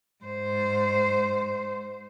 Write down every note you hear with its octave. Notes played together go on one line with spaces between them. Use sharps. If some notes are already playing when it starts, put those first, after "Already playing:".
G#2 C5